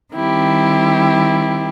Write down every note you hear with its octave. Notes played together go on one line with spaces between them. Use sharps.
D#3 G3 C4 E4 G4